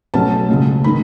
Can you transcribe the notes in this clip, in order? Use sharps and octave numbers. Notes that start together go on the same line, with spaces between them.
B1 B2 F#3 A3 C#4 A5
C#2 C#3 G#3
D#3 G#3 D#4 B5